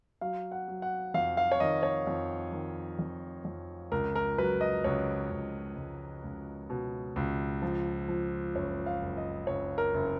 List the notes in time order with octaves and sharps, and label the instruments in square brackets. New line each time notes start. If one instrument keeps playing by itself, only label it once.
[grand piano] F#3 F5
F#5
F#3
F#5
F2 F5
F5
C#5
D#3 D#5
C#5
F2
D#3
F2
F2
C#2 A#4
A#4
F#3 B4
D#5
C#2 C#5
C#2
C#2
C#2
B2
C#2
F3
F3
F#1 C#5
F5
F#1
D#5
F#1 C#5
A#4
F#1